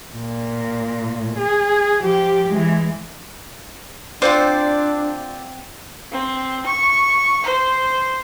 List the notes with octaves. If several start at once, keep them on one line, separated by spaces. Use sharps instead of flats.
A#2
G#4
F3 G4
E3 G#3
C4 D4 F4 C5 D5 F#5
C4
C#6
C5